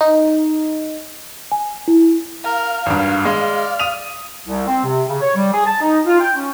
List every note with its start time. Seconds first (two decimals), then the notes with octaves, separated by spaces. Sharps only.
0.01 D#4
1.52 G#5
1.88 E4
2.44 A#4 F5
2.86 G#1 G2 A#4
3.25 G#3 D5
3.80 D#6 D#7 F7
4.46 C2
4.67 C4
4.84 C3
5.08 C#3
5.21 C#5
5.36 G3
5.53 G#4
5.65 A5
5.81 D#4
6.05 F4
6.20 G5
6.35 C#4